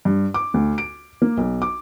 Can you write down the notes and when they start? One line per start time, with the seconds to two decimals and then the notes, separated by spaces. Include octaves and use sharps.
0.05 G2
0.34 D6
0.54 D2
0.78 D7
1.22 A#3
1.37 B1
1.62 D6